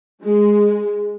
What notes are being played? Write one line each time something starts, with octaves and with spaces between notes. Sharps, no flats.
G#3